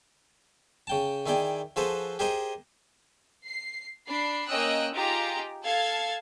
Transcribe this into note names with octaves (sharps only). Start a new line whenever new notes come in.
C#3 G5 A5
D#3 E4 G#4 D5 G5
F3 F#4 G#4 A4 B4 C5
G4 G#4 A#4 C5 D#5 G#5
C7
D4 B5 C7
A#3 C#4 D#5 G5 E6 F#6
D#4 F4 G4 G#4 G5 A#5
A4 F5 A5 G#6